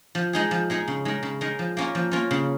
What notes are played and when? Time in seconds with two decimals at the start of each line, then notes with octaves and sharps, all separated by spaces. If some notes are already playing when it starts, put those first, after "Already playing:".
0.15 F3
0.33 G#3 D#4 G#4
0.51 F3
0.70 G#3 D#4 G#4
0.88 C#3
1.05 G#3 D#4 A#4
1.23 C#3
1.41 G#3 D#4 A#4
1.59 F3
1.77 A#3 C#4 F4 A#4
1.95 F3
2.11 A#3 C#4 F4 A#4
2.31 C#3